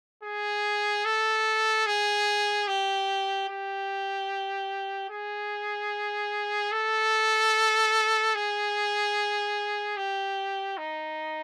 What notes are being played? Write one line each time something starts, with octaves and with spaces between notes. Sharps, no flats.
G#4
A4
G#4
G4
G4
G#4
A4
G#4
G4
D#4